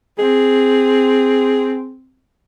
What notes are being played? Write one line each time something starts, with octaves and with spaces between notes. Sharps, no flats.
C4 G#4